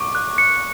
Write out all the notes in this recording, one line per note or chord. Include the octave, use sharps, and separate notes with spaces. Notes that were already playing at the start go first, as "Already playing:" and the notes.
Already playing: C#6 D6
F#6
C#7